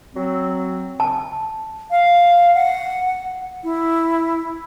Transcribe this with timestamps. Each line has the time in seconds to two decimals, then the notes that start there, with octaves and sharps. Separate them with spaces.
0.15 F#3 C4
1.00 A5
1.91 F5
2.55 F#5
3.64 E4